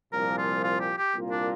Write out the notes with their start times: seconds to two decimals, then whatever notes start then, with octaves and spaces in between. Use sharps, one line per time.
0.13 C2 A#2 F3 A#4
0.38 F4
0.63 F4
0.80 G4
0.98 G4
1.13 C2 A#2 A#3 F4
1.31 D4